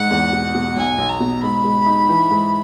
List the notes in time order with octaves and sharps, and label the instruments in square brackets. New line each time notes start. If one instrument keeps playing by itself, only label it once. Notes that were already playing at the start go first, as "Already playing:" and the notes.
Already playing: [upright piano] G#2 [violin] F#5
[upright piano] E2
B2
B2
[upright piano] B1 [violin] G#5
[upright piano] B1
[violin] A#5
[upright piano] B2
[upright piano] G#2 [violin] B5
[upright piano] G#3
D#4
E3
G#2